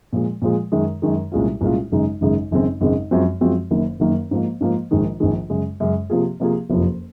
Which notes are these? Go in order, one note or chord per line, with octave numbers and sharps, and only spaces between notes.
A#2 F3 G#3
A#2 F3 G#3
F#2 D#3 G#3
F#2 D#3 G#3
C2 A#2 G#3 C#4 F4
C2 A#2 G#3 C#4 F4
G#1 F#2 C#3 G#3 D#4
G#1 F#2 C#3 G#3 D#4
G#1 F#2 C#3 G#3 C4
G#1 F#2 C#3 G#3 C4
F#2 F3 G#3 C4 F#4
F#2 F3 G#3 C4 F#4
F#1 F#2 D#3 A#3
F#1 F#2 D#3 A#3
G#2 F3 A#3
G#2 F3 A#3
A#1 G#2 D#3 G#3
A#1 G#2 D#3 G#3
F#2 C#3 G#3
F#2 C#3 G#3
C3 F3 A#3 F4 G#4
C3 F3 A#3 F4 G#4
F#1 F2 C3 F3